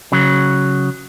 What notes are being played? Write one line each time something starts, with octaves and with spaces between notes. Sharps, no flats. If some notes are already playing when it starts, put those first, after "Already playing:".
C#3 F#3